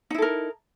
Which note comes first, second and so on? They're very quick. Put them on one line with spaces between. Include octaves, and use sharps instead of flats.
D#4 E4 A4 A#4